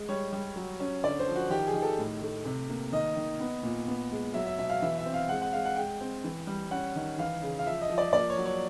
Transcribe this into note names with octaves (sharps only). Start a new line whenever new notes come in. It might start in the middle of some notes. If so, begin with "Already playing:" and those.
Already playing: G#3
G3 C#5
G3
F#3
C#4
D3 D5
C5
F3
F#4
D#3 G4
G#4
D#3
A4
A2
A3
C3
A#3
D#3 D#5
D#3
B3
A#2
B3
G#3
F#3 E5
E5
B2 E5
F5
E3 E5
E5
C4
F5
G#3 F#5
F#5
G#3 F5
F#5
G#3 G5
C4
E3
G3
C#4 F#5
D#3
E3 F5
C#3
F5
F3 E5
D#5
F3
D5
A#3 D5
C#5
F#3
C#5